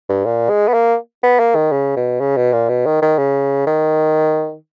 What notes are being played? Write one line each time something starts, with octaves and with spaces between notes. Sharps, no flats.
G2
A#2
G#3
B3
A#3
B3
A#3
D#3
C#3
B2
C#3
B2
A#2
B2
D#3
D#3
C#3
D#3